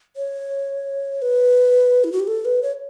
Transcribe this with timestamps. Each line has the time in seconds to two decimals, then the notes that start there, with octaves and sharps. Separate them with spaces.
0.17 C#5
1.22 B4
2.04 E4
2.12 F#4
2.20 G4
2.27 A4
2.45 B4
2.62 C#5